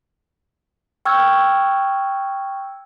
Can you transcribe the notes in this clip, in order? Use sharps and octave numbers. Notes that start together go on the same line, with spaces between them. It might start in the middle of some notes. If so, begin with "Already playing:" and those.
G5 C#6 E6 F6 G6 G#6